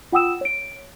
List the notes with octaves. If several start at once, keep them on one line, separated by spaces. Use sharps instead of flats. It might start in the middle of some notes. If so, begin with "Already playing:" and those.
F4 F#5 G5 D#6 E6 E7
C#5 D7